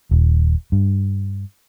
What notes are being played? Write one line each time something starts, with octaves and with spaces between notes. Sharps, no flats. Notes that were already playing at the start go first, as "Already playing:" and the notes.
D#1
G2